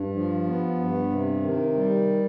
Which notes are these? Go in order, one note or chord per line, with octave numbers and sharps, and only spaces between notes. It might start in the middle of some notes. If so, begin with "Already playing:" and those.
Already playing: G2
F3
B3
G2
C3
D#3
G3